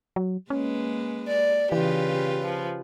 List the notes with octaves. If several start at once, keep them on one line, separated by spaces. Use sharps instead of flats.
F#3
G#3 A#3 C#4 B4
D5
C#3 E3 F4 G4 B4
F3